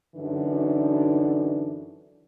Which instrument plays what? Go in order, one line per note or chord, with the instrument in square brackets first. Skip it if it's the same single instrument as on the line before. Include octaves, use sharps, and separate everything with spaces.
[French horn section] F#2 D3 E3 D4 D#4